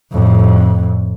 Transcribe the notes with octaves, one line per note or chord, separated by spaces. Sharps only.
F2 A2